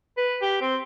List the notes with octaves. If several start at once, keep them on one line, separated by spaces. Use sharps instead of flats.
B4
G4
C4